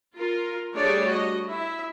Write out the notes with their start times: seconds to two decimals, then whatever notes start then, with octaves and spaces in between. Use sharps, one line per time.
0.16 F4 A#4
0.74 G3 A3 D4 G#4 C#5 D5
1.07 F#4 D#5
1.46 E4 E5